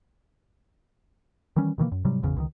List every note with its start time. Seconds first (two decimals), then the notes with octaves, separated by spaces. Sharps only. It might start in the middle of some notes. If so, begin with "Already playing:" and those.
1.56 D#3 E3 G3 C#4
1.78 B2 D#3 E3 A#3
1.92 F#2
2.05 G#2 C3 F#3 G3
2.23 G#1 E2 C#3
2.37 C#2 B2 D#3